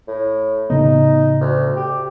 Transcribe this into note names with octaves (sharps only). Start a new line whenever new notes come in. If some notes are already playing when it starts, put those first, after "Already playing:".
A2
A2 C#3 B3 D#4
D2
G4